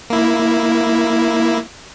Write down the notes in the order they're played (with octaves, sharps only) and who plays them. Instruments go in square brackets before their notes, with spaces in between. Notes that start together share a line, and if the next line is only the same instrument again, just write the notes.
[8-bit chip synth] A#3 E4